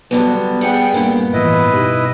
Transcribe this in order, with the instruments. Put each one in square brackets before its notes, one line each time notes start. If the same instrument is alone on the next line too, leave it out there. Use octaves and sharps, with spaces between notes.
[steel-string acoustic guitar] D3 F#3 B3 [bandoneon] G3
[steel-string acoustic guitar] B3 G#4 [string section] F#5 G5
[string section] G2 [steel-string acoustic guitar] A#2 B3 [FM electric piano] D4 A#4
[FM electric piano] A2 E3 [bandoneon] E4 B4 D#5
[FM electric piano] B2 D#4 G4